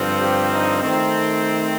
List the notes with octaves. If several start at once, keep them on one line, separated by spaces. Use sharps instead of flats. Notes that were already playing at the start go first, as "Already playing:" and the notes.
Already playing: G2 D3 F3 C4
G4
D#4
D#3 A3 C4